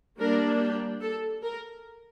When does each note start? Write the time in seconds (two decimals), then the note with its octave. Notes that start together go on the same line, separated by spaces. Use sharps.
0.19 G3 A#3 D4 A#4
0.60 G4
1.01 A4
1.43 A#4